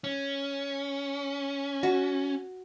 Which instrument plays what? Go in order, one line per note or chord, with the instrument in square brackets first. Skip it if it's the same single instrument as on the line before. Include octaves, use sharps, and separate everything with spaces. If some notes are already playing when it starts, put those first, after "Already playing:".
[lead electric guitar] C#4
[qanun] F#4